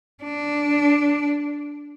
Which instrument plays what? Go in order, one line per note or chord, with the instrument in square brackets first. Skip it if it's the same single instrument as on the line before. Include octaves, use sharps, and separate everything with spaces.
[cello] D4